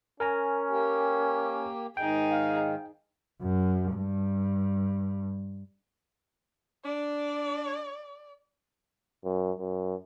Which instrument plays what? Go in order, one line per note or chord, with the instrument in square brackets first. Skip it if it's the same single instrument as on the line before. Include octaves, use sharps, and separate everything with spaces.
[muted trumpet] C#4 [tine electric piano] A#4 G#5 A#5
[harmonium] A#3 G4
[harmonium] G#2 D#3 [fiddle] D#4 G#4 [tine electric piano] G5
[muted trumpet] F5
[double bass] F#2
G2
[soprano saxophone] D4 [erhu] D5
[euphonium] F#2
F#2